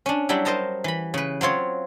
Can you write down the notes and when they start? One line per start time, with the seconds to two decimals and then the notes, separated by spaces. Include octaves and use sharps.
0.06 C#4 D4
0.29 F#3 G3 D4 E4
0.45 A#4 C5 D#5 A5 A#5
0.84 E3 B5
1.14 C#3 B4
1.41 F#3 C4 F4 C#5